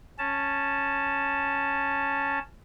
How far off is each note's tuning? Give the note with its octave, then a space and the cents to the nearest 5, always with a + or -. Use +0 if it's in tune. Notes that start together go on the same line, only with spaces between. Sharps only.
C#4 +0 A5 +0